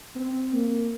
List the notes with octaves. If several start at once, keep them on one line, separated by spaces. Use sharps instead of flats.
C4
A#3